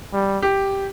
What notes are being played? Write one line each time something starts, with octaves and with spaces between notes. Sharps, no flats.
G3
G4